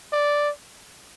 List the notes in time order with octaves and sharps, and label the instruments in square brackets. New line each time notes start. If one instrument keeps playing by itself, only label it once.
[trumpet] D5